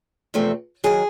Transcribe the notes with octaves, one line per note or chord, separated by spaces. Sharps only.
E2 C3 F3 A3 C4
D#3 F#3 G#4